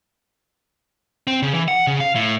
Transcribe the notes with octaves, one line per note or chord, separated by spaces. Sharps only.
C4
C#3
E3
F#5
C#3
F5
A2